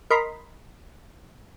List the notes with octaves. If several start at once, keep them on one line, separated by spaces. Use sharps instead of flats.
A#4 D#5 B5 C6